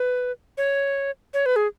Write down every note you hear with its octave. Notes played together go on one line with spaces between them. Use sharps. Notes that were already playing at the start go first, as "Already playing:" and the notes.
Already playing: B4
C#5
C#5
B4
G#4